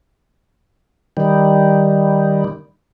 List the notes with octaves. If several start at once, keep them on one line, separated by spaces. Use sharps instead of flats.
D#3 G3